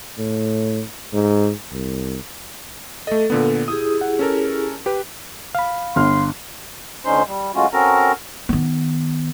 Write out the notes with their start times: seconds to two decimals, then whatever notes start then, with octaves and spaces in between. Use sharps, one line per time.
0.19 A2
1.13 G#2
1.72 C2
3.07 A3 A4 D#5
3.30 A#2 D3 B3
3.68 E4 G4 G#4 D#6
4.01 F#5
4.19 C#4 A4 A#4
4.86 G4 B4
5.55 F5 B5
5.96 G1 C6 F6
7.05 D2 D3 C#4 D#4 C5 C6
7.26 G3
7.55 F#3 G#3 A3 C#4 F4 F#4
7.73 C4 C#4 F#4 A4 A#4 A#5
8.49 D#3 B3